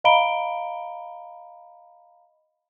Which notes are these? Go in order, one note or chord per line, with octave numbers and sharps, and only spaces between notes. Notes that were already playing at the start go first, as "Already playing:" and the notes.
D#5 F5 A#5 B5 D7 G7